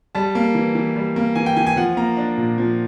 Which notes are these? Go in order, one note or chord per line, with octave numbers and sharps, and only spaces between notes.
G3 A5
A#3
E3
E3
G3
A#3
E3 G#5
G5
E3 G#5
G#5
F3 F#5
A#3 A#5
D4
A#2
F3